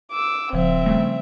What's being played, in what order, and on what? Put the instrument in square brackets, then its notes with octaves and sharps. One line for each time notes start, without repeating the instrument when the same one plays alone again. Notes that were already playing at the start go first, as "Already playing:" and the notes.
[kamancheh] D6 E6
[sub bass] D#1 [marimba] C#3 F3 C5 [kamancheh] C4 E5
[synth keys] C#3 A3 [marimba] G3